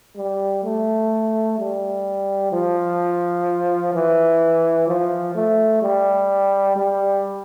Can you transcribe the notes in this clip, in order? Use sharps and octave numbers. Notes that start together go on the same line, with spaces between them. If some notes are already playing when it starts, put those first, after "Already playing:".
G3
A3
G3
F3
E3
F3
A3
G3
G3